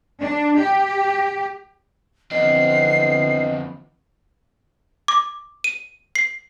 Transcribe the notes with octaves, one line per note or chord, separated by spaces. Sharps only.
D4
G4
F2 D3 E3 B3 C4 D#5 C7
D6
D#7
C7